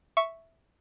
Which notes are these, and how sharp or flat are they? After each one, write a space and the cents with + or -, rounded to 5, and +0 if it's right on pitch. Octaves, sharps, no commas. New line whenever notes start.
E5 +0 C#6 +0